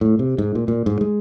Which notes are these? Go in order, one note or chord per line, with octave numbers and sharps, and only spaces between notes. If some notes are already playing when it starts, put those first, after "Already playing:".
A2
C3
G#2
A#2
A#2
G#2
G#3